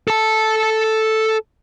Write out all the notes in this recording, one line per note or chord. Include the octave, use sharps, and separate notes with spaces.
A4 A5